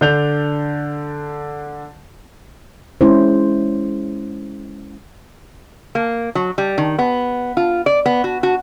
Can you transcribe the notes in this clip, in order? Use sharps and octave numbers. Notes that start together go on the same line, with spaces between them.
D3 D4 G6 F7
G#3 C#4 E4 C5
A#3
F#3
G3
D#3
B3
F4
D5
B3
F#4
F#4